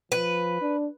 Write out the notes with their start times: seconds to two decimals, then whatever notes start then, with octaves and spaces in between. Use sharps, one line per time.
0.12 F3 B4
0.62 D4